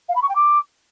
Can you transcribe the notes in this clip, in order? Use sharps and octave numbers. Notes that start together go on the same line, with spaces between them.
F5
B5
C#6
G5
D6